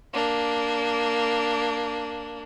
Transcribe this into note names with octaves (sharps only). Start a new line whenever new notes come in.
A#3 D4